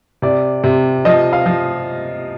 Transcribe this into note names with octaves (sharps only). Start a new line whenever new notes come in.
C3 D5
C3
F3 D#5
F5
F3